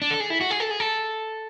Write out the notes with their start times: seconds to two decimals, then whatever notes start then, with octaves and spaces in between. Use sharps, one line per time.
0.02 D4
0.11 A4
0.20 G#4
0.30 E4
0.41 F#4
0.50 G#4
0.60 A4
0.71 G#4
0.80 A4